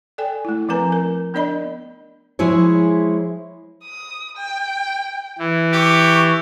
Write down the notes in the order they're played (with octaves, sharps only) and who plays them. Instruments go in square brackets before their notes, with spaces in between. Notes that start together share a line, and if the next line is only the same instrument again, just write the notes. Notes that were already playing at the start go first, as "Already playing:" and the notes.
[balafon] A4 D5 G5 G#5
A3 E4
F3 C4 A#4 B4 G#5 A#5
A#4
B3 D4 A#4 D5 D#5 B5
[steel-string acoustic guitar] F3 G#3 E4 G#4 C#5
[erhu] D#6
G5
[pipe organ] E3
[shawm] G4 [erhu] C#6